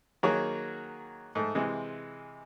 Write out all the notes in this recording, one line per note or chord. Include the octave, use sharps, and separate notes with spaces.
D#3 F#3 A#3 G#4 A#4 C#5
G#2 A3
C3 E3 G#3